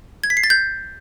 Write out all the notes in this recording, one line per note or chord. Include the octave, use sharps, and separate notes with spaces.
G#6
B6
C7
A6
G6